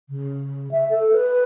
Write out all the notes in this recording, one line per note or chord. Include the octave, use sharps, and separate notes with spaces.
C#3
E5
A4
B4